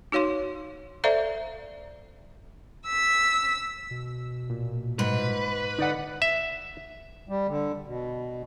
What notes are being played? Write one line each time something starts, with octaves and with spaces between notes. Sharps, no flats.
D#4 F#4 C#5 F5 C6
A4 C5 D5 E5 F5 A#5
E6 B6
B2
A#2
G#2 B4
D3 D#4 D5 F#5
E5
G3
D3
B2